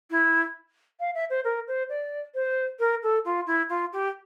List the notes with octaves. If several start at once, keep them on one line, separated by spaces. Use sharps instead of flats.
E4
F5
E5
C5
A#4
C5
D5
C5
A#4
A4
F4
E4
F4
G4